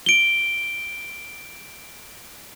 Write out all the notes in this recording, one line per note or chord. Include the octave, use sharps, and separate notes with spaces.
D7 G7